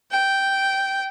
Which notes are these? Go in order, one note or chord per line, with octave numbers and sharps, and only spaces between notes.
G5